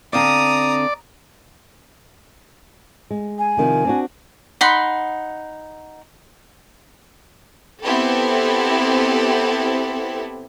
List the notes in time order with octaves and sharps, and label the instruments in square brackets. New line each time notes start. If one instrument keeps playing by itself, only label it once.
[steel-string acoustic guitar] D3 C4 F5 [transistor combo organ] D5 [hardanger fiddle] A#5 D#6
[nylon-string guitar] G#3
[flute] G#5
[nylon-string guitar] C3 D#3 F3
C4 D4 F#4
[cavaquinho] D#4 F#5 B5 C6
[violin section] B3 C4 E4 G4 A4